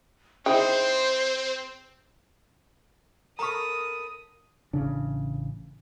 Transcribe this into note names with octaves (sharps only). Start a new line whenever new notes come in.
C4 D#4 E4 G#4 C5 G5
A4 A#4 A#5 B5 C#6 D#6
A1 C#3 D4